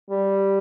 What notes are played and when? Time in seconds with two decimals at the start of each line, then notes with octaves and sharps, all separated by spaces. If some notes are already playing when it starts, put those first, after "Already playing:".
0.10 G3